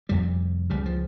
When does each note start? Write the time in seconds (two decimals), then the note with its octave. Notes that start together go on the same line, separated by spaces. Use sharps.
0.09 F1 F2 C3 G3
0.70 C#2 C#3 G3
0.86 F3